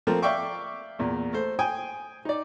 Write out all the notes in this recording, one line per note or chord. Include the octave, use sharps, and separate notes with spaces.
F3 A3 A#3 C4
D5 E5 F5 G5 C#6 D6
E2 A#2
A3 A4 C5
G5 G#5 D#6
D#4 D5